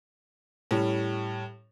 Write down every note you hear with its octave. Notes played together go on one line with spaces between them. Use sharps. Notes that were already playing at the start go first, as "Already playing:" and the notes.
A2 G3 C#4